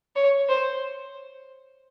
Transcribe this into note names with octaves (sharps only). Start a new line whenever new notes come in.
C#5
C5